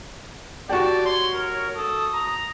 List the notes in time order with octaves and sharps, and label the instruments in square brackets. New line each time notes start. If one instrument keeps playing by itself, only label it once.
[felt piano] F#4 G4 [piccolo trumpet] D5 [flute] A5
[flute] C#5 [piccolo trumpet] C6
[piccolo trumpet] A#4
[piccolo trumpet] A4 [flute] D#6
[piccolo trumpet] A#5